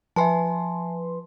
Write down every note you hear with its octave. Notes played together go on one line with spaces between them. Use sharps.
F3 B4 E5 G#5 A5 C6